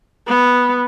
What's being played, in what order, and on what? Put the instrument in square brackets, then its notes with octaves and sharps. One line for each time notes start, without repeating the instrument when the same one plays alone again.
[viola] B3